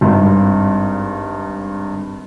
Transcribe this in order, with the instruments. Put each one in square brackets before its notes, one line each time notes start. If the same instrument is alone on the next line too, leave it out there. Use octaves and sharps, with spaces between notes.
[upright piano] G#1 G2